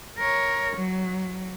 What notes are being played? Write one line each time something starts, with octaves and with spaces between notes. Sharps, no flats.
A#4 C#5
F#3